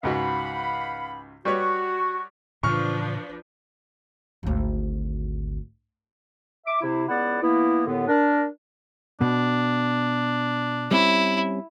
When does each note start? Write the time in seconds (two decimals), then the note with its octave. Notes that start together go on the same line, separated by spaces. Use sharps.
0.03 C#2 G#2 F#4 F5 F#5 B5
1.45 G3 F#4 B4 C#5 C#6
2.63 A2 C#3 E3 F3 D4 B4 C#6 F6
4.43 G#1 D2
6.66 E5 D6
6.82 C3 E4
7.08 C#2 B3 E4 D5 F#5
7.42 E3 A#3 B3 E4
7.86 D#2 A2 D3 B3
8.07 D4 A#4
9.21 B2 D4
10.91 G3 C4 C#4 E4